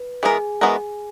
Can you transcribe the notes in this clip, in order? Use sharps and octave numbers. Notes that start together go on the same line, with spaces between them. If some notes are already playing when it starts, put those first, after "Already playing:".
Already playing: B4
E3 G#3 B3 F#4 G#4 A#4 G#5
E3 G#3 B3 F#4 A#4